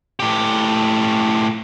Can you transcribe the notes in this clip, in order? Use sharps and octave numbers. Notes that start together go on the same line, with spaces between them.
A2 G4